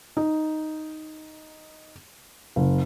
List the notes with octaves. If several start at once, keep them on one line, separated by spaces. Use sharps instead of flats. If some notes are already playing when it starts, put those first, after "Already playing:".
D#4
F#1